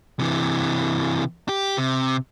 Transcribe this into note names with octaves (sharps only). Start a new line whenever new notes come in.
C3 E3
G4
C3